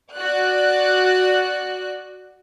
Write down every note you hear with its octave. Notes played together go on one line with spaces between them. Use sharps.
F#4 D5 F#6